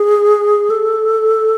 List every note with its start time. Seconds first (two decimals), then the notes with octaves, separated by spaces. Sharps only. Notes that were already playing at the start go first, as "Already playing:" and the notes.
Already playing: G#4
0.70 A4